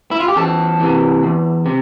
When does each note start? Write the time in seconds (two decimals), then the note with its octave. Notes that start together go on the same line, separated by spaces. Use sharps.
0.11 E4
0.20 F4
0.28 G4
0.37 E2 A4
0.80 C3 E3
1.23 E2
1.66 C3